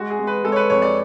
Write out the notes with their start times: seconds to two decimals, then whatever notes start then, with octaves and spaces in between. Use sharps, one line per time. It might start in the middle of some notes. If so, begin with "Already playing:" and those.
Already playing: G#3 F#4
0.10 G#4
0.19 G#3
0.27 B4
0.44 G#3 A4
0.52 C#5
0.56 B4
0.70 F2 C#5
0.82 D5